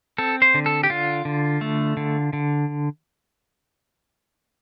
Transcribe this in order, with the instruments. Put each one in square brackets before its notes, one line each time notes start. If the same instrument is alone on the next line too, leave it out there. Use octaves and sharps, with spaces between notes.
[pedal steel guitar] C4 A4
C5
D3
A4
G4
D3 F4
D3
A3
D3
D3